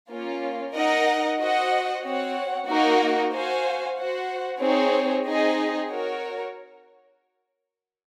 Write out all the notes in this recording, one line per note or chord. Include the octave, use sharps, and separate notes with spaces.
A#3 C#4 F4
D#4 A#4 D#5 F#5
F#4 C5 D#5 F#5
C4 F#4 C#5 F#5
A#3 D#4 F#4 A#4 D#5
F#4 C5 F5 G#5
F#4 C5 F#5
C4 D#4 G#4 C#5
C4 D#4 G#4 D#5
F#4 A#4 C#5